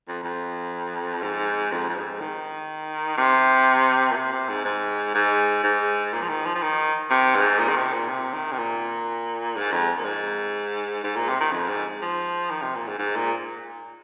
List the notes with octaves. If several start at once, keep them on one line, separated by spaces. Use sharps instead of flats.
F2
F2
G#2
F2
F2
G#2
D#3
C3
A#2
C3
C3
G#2
G#2
G#2
G#2
A#2
F3
D#3
F3
F3
D#3
C3
G#2
A#2
D#3
C3
A#2
C3
D#3
C3
A#2
G#2
F2
A#2
G#2
G#2
A#2
C3
D#3
F2
G#2
F3
D#3
C3
A#2
G#2
G#2
A#2